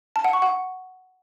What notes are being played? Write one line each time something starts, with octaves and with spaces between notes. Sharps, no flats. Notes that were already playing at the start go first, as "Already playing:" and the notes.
A5
F#5
C#6
F#5